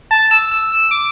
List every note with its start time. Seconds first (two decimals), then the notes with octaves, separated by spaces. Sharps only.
0.11 A5
0.31 E6
0.52 E6
0.72 E6
0.91 D6